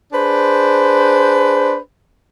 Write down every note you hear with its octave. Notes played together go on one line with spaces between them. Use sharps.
D4 G#4 B4 C5